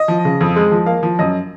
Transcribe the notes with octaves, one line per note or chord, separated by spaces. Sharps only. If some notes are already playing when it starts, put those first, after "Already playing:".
Already playing: D#5
F3
C#3
F2
G#3
F3
A#3 F5
F3
F#2 D#5